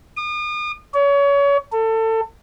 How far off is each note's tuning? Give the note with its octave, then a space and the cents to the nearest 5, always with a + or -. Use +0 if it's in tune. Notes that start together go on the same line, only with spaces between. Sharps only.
D#6 -40
C#5 +30
A4 +25